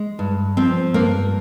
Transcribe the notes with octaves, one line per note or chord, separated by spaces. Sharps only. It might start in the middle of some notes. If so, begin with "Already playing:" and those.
Already playing: G#3
G2
F3 C4
G2 A#3